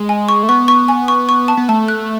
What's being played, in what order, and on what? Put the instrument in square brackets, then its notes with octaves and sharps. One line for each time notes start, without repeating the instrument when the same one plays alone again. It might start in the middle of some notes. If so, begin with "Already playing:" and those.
Already playing: [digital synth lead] G#3
[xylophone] G#5
C#6
[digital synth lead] A3
[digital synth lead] B3 [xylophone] C#6
[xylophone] C#6
G#5
C#6
C#6
A5
[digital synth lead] B3
[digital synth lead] A3 [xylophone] A5
[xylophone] F#6